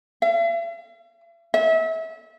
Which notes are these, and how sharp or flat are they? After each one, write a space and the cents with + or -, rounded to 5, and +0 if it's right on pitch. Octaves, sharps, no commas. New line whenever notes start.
E5 +45
E5 -30